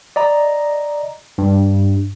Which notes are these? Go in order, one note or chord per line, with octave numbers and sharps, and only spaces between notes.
D5 D#5 A#5
G2